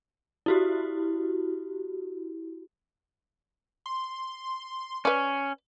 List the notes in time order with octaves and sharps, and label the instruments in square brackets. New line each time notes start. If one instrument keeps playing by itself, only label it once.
[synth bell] E4 F#4 G4
[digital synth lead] C6
[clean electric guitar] C#4 [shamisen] B4 D5